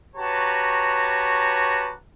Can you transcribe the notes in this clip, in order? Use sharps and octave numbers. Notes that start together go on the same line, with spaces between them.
F#4 G4 B4 C#5 A5 A#5